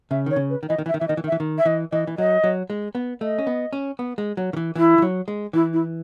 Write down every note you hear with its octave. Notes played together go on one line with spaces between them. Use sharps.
C#3 E5
D#3 C#5
C#3
B4
D#3
E3 D#5
D#3
E3 E5
D#3
E3 E5
D#3 D#5
E3
D#3
E5
E3
D#3
E5
E3 D#5
E3 D#5
E3
F#3 D#5
F#3
G#3
B3
A3 D#5
C#4
B3
C#4
B3
G#3
F#3
D#3
E3
E3 E4
E3
F#3
G#3
E3 E4
E4